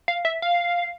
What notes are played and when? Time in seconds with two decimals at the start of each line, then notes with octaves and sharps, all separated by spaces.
0.08 F5
0.25 E5
0.42 F5